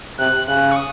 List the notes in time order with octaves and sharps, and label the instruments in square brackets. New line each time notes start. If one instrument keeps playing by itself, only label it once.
[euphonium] C3 [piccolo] F#6
[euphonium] C#3 [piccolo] F#6
[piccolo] C#6
D#6